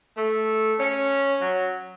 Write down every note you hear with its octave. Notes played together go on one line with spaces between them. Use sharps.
A3
C#4
F#3